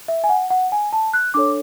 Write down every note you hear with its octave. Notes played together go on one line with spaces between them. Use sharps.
E5
G#5
F#5
F#5
G#5
A5
F#6
D4 A4 C#5 D6